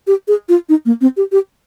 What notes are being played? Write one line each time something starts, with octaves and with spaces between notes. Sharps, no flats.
G4
G#4
F4
D#4
A#3
C4
G4
G4